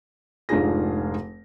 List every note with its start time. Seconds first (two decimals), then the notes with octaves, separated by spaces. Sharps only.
0.49 F1 G#2 D4 F4 G#4 A#6